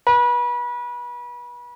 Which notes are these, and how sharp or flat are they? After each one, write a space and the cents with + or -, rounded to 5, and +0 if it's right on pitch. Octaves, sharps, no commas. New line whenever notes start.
B4 -30